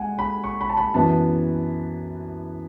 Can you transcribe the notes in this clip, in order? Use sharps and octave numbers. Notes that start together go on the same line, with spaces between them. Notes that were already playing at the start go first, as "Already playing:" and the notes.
Already playing: G#3 F#5 G#5
B5
C#6
B5
A5
B5
F#2 E3 B3 A5